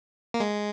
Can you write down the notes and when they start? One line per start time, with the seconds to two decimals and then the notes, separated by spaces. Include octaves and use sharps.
0.34 A#3
0.40 G#3